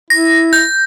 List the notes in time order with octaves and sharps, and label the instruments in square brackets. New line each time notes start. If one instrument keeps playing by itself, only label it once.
[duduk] E4 [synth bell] A#6
[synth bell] G6